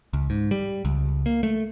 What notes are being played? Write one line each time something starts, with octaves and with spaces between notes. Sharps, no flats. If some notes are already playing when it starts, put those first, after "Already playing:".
C#2
G#2
G3
C#2
A#3
A3